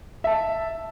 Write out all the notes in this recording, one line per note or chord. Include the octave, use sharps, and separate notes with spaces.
E5 A5